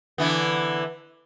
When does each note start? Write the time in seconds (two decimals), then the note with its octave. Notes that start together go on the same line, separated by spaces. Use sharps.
0.18 D3 E3 B3